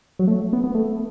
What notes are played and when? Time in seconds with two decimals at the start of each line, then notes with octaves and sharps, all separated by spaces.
0.19 F#3
0.27 A3
0.53 B3
0.64 B3
0.75 A3